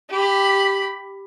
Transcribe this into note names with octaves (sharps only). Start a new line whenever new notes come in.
G4 B5